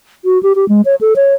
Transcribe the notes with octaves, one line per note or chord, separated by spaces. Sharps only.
F#4
G4
G4
G#3
C#5
A4
C#5